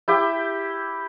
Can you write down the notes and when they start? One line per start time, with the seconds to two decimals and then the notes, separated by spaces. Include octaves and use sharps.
0.08 E4 G4 G5